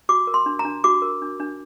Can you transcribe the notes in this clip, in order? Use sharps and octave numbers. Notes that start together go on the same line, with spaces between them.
F#4 D6
A#4
C6
D4
A#5
D4
F#4 D6
A#4
D4
D4